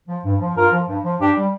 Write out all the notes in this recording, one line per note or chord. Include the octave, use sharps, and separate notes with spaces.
F3
G2
F3
G2 F4 A#4
F3
G2
F3
G2 D4 G4
G3